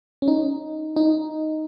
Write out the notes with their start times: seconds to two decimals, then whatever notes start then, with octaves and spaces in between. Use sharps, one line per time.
0.22 C#4
0.28 D#4
0.96 D#4